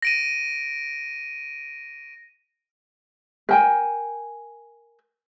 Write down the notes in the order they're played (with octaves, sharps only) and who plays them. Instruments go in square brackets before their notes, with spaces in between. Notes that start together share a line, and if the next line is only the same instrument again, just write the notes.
[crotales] A#6 D7 D#7
[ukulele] A#4 G5 G#5